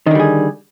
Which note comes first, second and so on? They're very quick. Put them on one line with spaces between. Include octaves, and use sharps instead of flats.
D#3 D3 G3 G#4